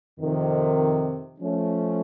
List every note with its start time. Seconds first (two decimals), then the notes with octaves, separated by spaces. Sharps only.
0.19 F2 C3 D#3
1.40 F3 A3 C#4